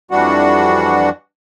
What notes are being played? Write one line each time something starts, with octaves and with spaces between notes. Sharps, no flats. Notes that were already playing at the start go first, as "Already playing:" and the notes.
F2 E3 G3 D4 F#4 F#5